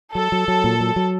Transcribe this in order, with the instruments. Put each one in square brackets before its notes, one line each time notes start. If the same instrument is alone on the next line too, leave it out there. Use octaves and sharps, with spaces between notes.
[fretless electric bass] F#3 [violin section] A4
[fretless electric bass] F#3
F#3
A#2
F#3
F#3